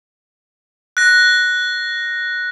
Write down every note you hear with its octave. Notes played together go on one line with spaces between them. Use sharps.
F#6 A#6